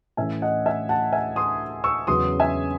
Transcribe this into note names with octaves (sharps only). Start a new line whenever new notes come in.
A2 E3 A3 C#4 E5 G#5
D#5 F#5
E5 G#5
F#5 A5
E5 G#5
C6 D#6
C#6 E6
E2 C#3 F#3 C#4 C6 D#6
E5 G#5